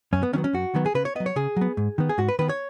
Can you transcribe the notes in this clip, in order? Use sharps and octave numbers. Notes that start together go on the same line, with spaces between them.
F#2 C#4
B3
D#3 F#3 B3 C#4
C#4
F#2 F#4
D#3 F#3 B3
G#4
C#3 B4
C#5
F#3 B3 D#5
C#5
C#3 G#4
F#3 B3
G#2
D#3 B3
G#4
G#2 F#4
B4
D#3 B3 B4
C#5